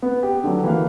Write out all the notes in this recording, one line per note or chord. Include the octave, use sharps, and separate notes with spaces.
B3
G4
D3 F#3
E3 A#3 F5